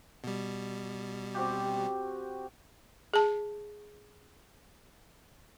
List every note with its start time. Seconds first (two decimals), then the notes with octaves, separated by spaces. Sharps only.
0.24 B2 G3
1.35 C4 F#4 G4
3.14 G#4 A5